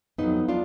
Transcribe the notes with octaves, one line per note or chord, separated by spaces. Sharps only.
F2 D#3 F#3 B3 D#4
D4 F4